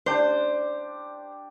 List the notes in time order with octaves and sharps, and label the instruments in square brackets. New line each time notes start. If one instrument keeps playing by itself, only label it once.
[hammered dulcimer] D4 G4 [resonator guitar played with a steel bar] C5